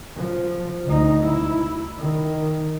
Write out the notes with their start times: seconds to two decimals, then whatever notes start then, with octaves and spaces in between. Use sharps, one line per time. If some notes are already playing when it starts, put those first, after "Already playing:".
0.16 F3
0.86 D2 D#4
1.24 E4
1.98 D#3